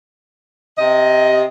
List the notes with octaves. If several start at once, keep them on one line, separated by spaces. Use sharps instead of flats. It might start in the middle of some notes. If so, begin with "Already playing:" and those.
C3 D#5